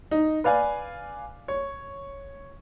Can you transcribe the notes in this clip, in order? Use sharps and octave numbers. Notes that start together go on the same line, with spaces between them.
D#4
B4 D5 F5 G#5
C#5